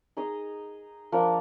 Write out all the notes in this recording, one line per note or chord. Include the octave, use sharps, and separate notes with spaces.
D#4 G#4 D#5
F3 A#3 D4